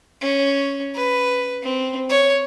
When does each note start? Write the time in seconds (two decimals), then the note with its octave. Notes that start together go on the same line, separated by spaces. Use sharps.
0.21 C#4
0.95 B4
1.63 C4
2.10 C#5